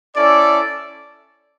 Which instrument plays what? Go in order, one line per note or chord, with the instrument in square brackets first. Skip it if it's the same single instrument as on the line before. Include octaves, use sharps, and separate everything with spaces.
[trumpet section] C#4 E4 A4 D5